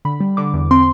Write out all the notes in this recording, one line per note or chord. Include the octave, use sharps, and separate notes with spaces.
D3 B5
G3
D3 D6
E2
C4 C6